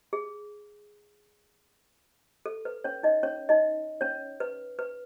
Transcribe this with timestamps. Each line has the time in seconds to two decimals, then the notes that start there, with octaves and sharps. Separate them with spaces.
0.13 G#4
2.46 A4
2.65 B4
2.84 C#4 C#5
3.03 D#4 D#5
3.23 C#4 C#5
3.49 D#4 D#5
4.01 C#4 C#5
4.40 B4
4.79 B4